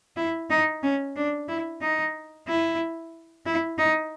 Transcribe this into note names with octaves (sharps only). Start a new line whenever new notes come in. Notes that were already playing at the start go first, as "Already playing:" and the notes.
E4
D#4
C#4
D4
E4
D#4
E4
E4
D#4